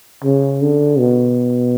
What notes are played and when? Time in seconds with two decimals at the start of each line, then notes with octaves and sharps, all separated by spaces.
0.24 C#3
0.61 D3
0.99 B2